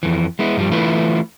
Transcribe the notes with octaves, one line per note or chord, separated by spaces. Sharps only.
F2 E3
G#3 B3 E4
G2 F3 G3
E3 A3 E4 F4 B4